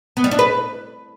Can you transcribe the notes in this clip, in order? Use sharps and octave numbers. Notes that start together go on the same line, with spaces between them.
B3
G3
D4
B4